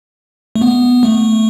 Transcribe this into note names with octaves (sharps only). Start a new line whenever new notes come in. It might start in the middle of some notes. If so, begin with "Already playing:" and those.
A3
B3
A3